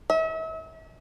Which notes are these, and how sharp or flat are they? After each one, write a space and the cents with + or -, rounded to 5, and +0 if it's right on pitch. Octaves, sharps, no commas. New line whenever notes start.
E5 -40